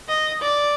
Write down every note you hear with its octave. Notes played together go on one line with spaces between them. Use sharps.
D#5
D5